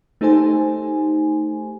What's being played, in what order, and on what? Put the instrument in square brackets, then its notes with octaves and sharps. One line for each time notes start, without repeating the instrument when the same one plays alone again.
[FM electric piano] A3 D#4 G4 A4 C5 G#5